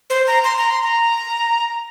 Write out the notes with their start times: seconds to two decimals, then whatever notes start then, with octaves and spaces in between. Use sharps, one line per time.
0.10 C5
0.27 A#5
0.44 C6
0.58 A#5
0.70 C6
0.83 A#5